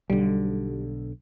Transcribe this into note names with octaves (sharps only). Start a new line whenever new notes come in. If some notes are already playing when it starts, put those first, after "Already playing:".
B1 D3 G3